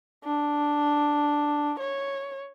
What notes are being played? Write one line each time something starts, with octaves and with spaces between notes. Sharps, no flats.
D4
C#5